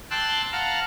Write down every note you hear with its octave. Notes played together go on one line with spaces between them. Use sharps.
G5 A5 C6 D6 E6 F#6
F5 F#5 A5 A#5